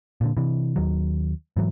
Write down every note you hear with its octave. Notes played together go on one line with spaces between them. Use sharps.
A#2 D3
C3 E3
D#2 D#3 F#3
G#2 E3 F#3